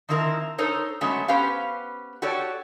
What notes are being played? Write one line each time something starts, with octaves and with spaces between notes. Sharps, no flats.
D#3 F3 C4 E4 A#4
D#4 A4 A#4 C5 C#5
F#3 G#3 A3 B3 C#4
B3 C#4 G4 B4 C5 F5
F#4 G4 A4 C#5 D5